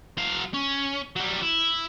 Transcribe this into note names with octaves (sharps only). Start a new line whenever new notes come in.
F#3 F5
C#4
F#3 G3
E4